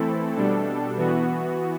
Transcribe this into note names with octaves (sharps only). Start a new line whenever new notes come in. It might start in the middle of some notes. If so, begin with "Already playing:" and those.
Already playing: E3 A3 C4 E4 A4
B2 G3 D4 A4
E3 B3 F#4